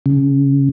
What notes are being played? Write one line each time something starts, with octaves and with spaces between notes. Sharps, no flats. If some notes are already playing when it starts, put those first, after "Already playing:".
C#3